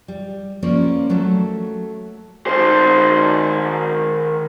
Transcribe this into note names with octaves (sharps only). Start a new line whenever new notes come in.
G3
F3 A#3 C#4 F4 A#4 D5
F#3 A3 A4 A#4
D#3 C5